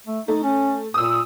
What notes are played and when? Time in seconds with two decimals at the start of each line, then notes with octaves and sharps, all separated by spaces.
0.07 A3
0.28 A3 D#4
0.43 C#4
0.94 A#2 D#6 E6